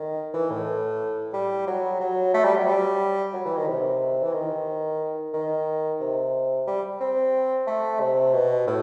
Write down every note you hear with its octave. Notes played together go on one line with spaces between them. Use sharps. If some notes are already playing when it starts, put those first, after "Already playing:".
Already playing: D#3
E3
A2
G3
F#3
F#3
A3
G3
F#3
G3
F#3
E3
D#3
C3
E3
D#3
D#3
C3
G3
C4
A3
C3
B2
A2